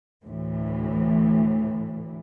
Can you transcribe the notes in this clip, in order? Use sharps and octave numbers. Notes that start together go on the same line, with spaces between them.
D2 A2 E3